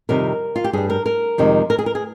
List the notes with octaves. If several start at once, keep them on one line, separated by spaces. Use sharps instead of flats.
F2 C3 D#3 G3 A#4
F4
G4
G2 G3 G#4
A#4
A#4
F2 C3 D#3 G#3
A#4
G#4
A#4
G#4